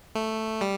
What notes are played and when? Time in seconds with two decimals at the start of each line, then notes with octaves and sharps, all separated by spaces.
0.15 A3
0.61 G3